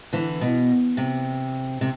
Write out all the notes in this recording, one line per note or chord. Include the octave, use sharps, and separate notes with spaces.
D3 E3
B2
C3
C3